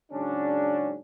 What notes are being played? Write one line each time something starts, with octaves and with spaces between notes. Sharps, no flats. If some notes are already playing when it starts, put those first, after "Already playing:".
G#2 C#3 F#3 C#4 D4